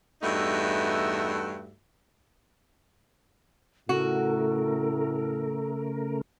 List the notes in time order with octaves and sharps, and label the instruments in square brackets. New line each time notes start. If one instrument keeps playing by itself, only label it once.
[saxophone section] E2 G2 A3 D#4 F#4 E5
[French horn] A2 [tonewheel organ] C#3 A3 A#4 [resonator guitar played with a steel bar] F#4 [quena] A4